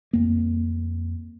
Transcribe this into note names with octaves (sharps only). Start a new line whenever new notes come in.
F2 A#3